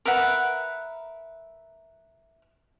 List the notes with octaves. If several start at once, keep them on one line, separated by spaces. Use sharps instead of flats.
A#4 B4 E5 F#5